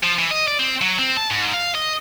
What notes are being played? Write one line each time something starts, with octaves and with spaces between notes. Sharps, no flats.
F3
E3
D#5
D5
C4
F#3
C4
A5
G#2
F5
D#5